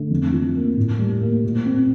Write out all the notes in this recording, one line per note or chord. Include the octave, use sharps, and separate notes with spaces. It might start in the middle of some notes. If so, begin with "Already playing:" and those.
Already playing: D3 A3
F2
F3
A#3
A2
G3
A#3
A#2
C4